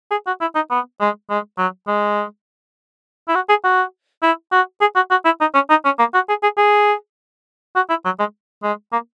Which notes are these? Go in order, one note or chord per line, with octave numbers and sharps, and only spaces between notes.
G#4
F#4
E4
D#4
B3
G#3
G#3
F#3
G#3
E4
F#4
G#4
F#4
E4
F#4
G#4
F#4
F#4
E4
D#4
C#4
D#4
C#4
A#3
F#4
G#4
G#4
G#4
F#4
E4
F#3
G#3
G#3
A#3